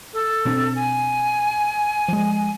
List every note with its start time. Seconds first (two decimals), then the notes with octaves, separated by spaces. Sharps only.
0.14 A4
0.45 B2 C4 D4
0.75 G#5
2.08 F3 G#3